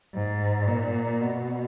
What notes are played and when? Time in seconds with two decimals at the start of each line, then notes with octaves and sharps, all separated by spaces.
0.14 G#2
0.68 A#2
1.20 B2